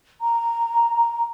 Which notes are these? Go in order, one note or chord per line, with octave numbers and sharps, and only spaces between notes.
A#5